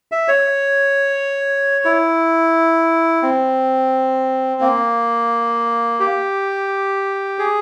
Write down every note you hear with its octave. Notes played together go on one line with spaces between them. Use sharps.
E5
C#5
E4
C4
A#3
G4
G#4